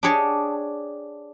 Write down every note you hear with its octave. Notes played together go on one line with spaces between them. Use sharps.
D4 G4 G#4 C#5 D#5 A5